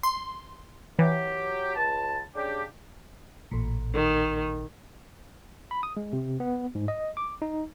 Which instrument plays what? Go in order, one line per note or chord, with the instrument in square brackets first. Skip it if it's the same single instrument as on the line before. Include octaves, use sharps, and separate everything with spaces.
[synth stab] C6
[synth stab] E3 [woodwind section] F#3 G4
[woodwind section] C#2 A5
C#3 D4 G4
[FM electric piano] A1 A#2
[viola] D#3
[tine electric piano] B5
D#6
G#3
C3
B3
G#2
D#5
D6
D#4